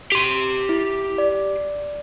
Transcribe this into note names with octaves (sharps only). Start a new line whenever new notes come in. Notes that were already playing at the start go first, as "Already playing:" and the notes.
G4 C6
E4
D5